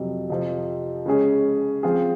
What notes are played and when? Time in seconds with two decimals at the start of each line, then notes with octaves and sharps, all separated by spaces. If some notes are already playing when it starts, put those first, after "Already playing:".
Already playing: F2 C3 F#3
0.30 F2 C3 F3
1.06 C#3 G#3 C#4 G#4
1.83 F3 C4 F4 G#4